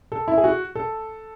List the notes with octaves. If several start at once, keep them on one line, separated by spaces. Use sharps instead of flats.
A4
E4
G#4
F#4
A4